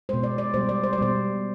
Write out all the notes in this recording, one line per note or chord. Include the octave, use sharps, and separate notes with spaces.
B2 G#3 C5
D5
D5
B2 G3 C5
D5
C5
D5
B2 G3 C5